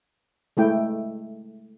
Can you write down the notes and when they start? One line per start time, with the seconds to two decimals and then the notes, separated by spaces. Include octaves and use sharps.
0.57 G#3 A3 E4 G5